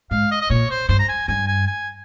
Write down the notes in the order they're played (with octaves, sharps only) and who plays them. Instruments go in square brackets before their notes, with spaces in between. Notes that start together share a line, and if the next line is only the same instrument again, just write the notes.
[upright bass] G#2 [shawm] F5
[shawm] D#5
D#5
[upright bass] A#2 [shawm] C#5
[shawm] C5
[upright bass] G2 [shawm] C5
[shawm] A#5
G#5
[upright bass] G2 [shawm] G#5
[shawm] G#5
G#5